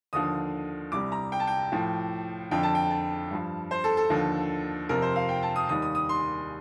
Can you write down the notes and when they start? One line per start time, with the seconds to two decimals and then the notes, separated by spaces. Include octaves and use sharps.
0.13 D#2 D3 F3 D#6
0.92 C2 C3 G3 D6
1.12 A#5
1.32 G5
1.40 A5
1.47 G5
1.72 A2 F3
2.51 F2 D3 F3 G5
2.63 A5
2.75 G5
2.90 A5
3.31 G2 F3
3.71 C5
3.84 A4
3.97 A4
4.10 D#2 D3 F3
4.89 F2 C3 F3 A#4
5.02 C5
5.16 F5
5.29 G5
5.43 A5
5.56 D#6
5.69 D#2 D#3 G3 D#6
5.82 D#6
5.95 D#6
6.09 C6